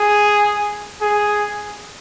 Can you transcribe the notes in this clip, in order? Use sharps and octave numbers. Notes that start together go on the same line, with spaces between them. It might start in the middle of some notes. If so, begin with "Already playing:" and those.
Already playing: G#4
G#4